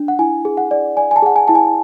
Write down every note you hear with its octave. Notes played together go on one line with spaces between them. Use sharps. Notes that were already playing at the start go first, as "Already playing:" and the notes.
Already playing: D4
F#5
E4 G#5
G#4
F#5
D5
D5 G#5
G#5
A5
G#4 F#5
G#5
E4 A5
G#5